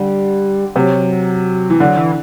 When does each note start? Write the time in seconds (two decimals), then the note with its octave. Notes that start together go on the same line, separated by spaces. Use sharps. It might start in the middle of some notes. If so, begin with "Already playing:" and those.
Already playing: D3 G3
0.75 C3 F#3
1.70 E3
1.80 D3 F#3
1.97 E3